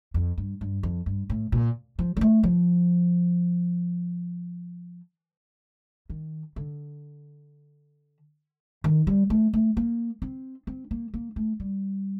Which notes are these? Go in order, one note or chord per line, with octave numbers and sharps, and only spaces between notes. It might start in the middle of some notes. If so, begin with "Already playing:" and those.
F2
G2
G2
F2
G2
A2
A#2
F3
G3
A3
F3
D#3
D3
D#3
G3
A3
A3
A#3
C4
C4
A#3
A#3
A3
G3